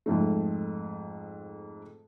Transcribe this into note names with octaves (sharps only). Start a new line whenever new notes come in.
F2 G#2 A3